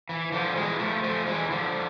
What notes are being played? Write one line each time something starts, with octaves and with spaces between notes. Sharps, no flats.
E3
D3 F3
E3 G#3
F3 A3
F3 A3
E3 G#3
D3 F3